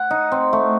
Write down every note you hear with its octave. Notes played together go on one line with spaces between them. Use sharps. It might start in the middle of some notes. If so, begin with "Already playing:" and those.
Already playing: F#5
D#4
C4
A3